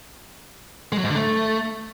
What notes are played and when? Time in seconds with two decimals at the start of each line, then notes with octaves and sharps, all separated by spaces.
0.92 G#3
0.98 F#3
1.04 G#2
1.10 D3
1.16 A3